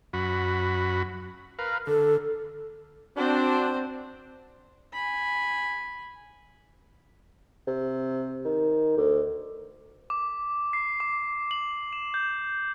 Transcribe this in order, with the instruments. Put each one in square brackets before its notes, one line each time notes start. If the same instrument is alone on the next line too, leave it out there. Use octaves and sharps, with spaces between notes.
[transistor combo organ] F#2 F#4 B5
A#4 B4 F5
[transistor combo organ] D3 [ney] A4
[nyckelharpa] C4 C5 [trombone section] D4 F#4
[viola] G#5 B5
[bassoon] C3
D#3
D2
[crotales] D6
C7
D6
F#7
E7
G6